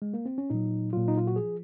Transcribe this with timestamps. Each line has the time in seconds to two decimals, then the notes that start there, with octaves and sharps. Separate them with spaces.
0.02 G#3
0.14 A#3
0.26 C4
0.38 C#4
0.50 A#2 F#3 D#4
0.93 A#2 F#3 F4
1.08 D#4
1.18 F4
1.27 F#4
1.36 F3 G#4